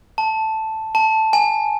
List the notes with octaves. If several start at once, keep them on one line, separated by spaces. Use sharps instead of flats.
A5
A5
G#5